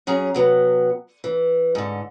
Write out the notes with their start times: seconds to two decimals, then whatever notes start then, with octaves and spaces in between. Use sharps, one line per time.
0.07 F#3 C#4 G#4 A#5
0.34 C3 F#3 B3
1.24 E3
1.75 G#2 D3